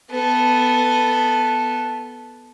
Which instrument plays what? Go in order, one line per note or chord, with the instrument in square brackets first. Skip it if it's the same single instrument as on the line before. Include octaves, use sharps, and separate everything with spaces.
[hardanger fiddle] B3 A4